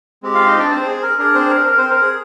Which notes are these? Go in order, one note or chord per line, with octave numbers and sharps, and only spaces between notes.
G#3 C4 G4
F4 F5
D#4 D#5
D4 D5
C4 C5
G#4
A#4
D4 G#4 A#4
C4 C5
A#4
A#4
C4 C5
A#4
G#4